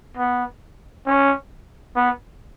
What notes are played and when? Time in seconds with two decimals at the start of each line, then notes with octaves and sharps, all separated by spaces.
0.17 B3
1.06 C#4
1.96 B3